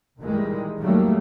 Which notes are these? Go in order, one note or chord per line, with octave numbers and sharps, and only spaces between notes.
A#2 D#3 E3 G3 G#3
D#3 F#3 G3 A3 A#3